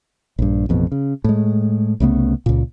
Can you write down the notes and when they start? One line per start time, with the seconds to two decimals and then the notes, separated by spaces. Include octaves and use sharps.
0.39 A#1 G2
0.69 A1 F2 B2
0.92 C#3
1.24 A2 G#3
2.00 C2 C#3 A3 B3
2.46 C#2 A#2